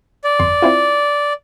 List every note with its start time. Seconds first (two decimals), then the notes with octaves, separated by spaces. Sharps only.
0.24 D5
0.39 G1 F2 C6
0.62 C4 E4 F4